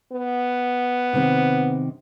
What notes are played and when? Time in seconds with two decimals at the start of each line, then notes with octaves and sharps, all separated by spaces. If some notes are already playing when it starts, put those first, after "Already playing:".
0.13 B3
1.13 C3 D#3 C4